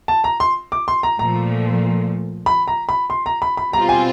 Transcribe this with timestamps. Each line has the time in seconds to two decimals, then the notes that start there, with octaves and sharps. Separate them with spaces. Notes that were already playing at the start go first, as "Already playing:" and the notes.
0.08 A5
0.24 A#5
0.40 C6
0.72 D6
0.88 C6
1.03 A#5
1.19 A#2 F3 A3 A#5
2.46 B5
2.68 A#5
2.89 B5
3.10 C6
3.26 A#5
3.42 B5
3.57 B5
3.73 B2 G3 C4 F4 A#5
3.89 G#5